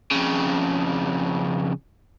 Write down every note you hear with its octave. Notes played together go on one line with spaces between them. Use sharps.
F2 C#3